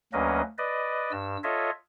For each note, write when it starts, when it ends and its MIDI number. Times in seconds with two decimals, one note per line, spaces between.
0.13 0.42 38
0.13 0.42 54
0.13 0.42 58
0.13 0.42 61
0.13 0.42 71
0.13 0.42 75
0.58 1.12 71
0.58 1.12 74
0.58 1.12 75
1.12 1.37 43
1.12 1.37 88
1.43 1.70 65
1.43 1.70 69
1.43 1.70 73
1.43 1.70 75
1.43 1.70 76